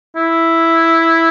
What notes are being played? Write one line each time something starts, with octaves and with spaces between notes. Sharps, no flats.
E4